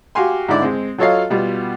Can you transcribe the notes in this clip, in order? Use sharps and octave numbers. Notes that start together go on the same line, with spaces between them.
F#4 G4 F5 G#5 C6
G#2 D3 E4 D5
G#3 C4
F#3 F4 A4 C#5 D#5 F5
B2 G3 B3 F4